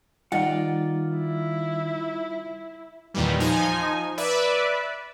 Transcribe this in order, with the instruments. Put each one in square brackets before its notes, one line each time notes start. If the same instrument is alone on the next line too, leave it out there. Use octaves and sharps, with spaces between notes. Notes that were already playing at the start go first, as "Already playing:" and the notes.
[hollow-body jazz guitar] D#3 D#5 F#5 [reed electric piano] G3 D#4 [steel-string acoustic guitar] F4 D5
[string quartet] E4
[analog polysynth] E2 A#2 D#3 E3 G3
F3 D#4 G#5
B4 D5 E5